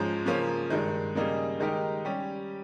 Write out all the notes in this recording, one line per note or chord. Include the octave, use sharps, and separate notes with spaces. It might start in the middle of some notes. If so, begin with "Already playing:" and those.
Already playing: G#2 F3 G#3 C#4
C#3 F3 A#3 C#4
G2 D#3 G#3
C#3 G3 A#3 D#4 G#4
D#3 G#3 D#4 G4 A#4
G3 C#4 G4